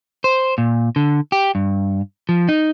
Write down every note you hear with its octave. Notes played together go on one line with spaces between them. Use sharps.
C5
A#2
D3
G4
G2
F3
D#4